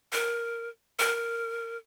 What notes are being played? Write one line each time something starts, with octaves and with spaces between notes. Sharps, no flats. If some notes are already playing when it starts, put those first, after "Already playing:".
A#4
A#4